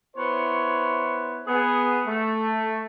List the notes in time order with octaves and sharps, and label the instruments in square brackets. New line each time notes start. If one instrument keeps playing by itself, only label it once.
[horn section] B3 E4 C5 C#5
B3 G#4
A3